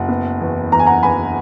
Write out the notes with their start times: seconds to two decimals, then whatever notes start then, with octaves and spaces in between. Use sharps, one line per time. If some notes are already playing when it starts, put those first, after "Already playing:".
Already playing: F#1 F#5
0.08 B3
0.40 E2
0.72 E2 A#5
0.79 G#5
0.86 F#5 A#5
1.03 E2 G#5 B5